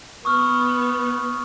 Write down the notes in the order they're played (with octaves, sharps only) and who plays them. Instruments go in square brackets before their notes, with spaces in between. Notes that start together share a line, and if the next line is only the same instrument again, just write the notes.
[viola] B3 [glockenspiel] C#6 D#6 F6